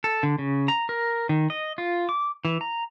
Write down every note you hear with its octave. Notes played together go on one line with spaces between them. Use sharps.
A4
D3
C#3
A#5
A#4
D#3
D#5
F4
D6
E3
A#5